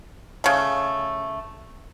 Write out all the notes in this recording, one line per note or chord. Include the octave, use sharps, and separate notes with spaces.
C#3 A3